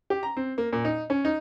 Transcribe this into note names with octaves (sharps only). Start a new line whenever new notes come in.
G4
A#5
C4
A#3
A#2
D#4
C#4
D#4